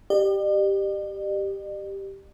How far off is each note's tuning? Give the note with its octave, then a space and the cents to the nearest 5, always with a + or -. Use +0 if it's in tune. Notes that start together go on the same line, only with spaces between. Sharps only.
G4 +0 D5 +45